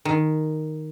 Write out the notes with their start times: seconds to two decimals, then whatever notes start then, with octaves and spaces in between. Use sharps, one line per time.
0.05 D#3